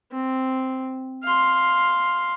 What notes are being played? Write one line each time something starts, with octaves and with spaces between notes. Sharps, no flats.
C4
F5 C6